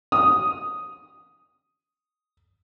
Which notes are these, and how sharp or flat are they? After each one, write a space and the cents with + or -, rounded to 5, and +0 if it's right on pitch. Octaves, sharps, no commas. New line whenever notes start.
D#6 +5